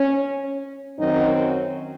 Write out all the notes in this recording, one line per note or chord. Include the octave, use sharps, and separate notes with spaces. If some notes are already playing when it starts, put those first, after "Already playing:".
Already playing: C#4
F#2 D#3 F#3 C4 D#4